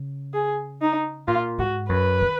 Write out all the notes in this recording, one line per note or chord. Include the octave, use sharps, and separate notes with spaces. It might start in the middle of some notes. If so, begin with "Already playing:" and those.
Already playing: C#3
G#4
D#4
A#2 F4
G#2 F#4
F#2 B4
D#3